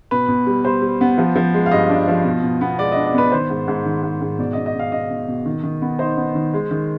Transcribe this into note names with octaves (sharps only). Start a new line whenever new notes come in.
B2 B4
B2
G3
G3 C5
G3
B3
F3
F3
G#3
F5
G2 D#5
D4
F3
B2
B2
B3
G#3 D5
D4 D#5
D5
B3 B4
D#3 C5
G#2
G#2
D#3
G#2
G#2
B2 D5
D#5
B2
D#5
B2 F5
B2 D#5
B2
B2
D#3
D#3
B3
D#4 C5
B3
D#3
G#3
D#3